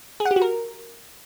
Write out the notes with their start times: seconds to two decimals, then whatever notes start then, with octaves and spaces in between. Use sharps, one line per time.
0.20 G#4
0.25 F#5
0.31 G4
0.36 F#4
0.42 A#4